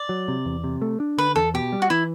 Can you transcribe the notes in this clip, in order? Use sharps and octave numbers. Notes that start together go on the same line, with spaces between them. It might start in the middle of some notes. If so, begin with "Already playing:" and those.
Already playing: D5
F#3
C3
E2
C3
A3
D4
D3 B4
E2 A4
B2 G4
G3
F#4
E3 E4